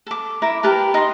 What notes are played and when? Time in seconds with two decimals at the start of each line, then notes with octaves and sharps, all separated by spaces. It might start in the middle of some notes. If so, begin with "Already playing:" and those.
0.07 A4 D6
0.42 E4 A#4 D6
0.63 G4 A#4 B4 A5
0.94 D#4 C6